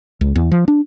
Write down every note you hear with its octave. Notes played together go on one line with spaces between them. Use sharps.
C#2
E2
F3
D4